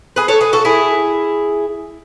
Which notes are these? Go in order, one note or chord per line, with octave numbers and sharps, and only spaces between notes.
G#4 B4
A4 C#5
G#4 B4
F#4 A4
E4 G#4